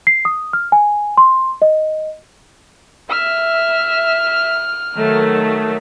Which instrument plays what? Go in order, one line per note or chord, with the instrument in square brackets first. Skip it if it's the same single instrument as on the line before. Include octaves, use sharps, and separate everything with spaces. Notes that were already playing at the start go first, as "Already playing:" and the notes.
[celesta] C7
D#6
F6
G#5
C6
D#5
[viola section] E5 [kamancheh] F6
[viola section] D#3 F#3 A3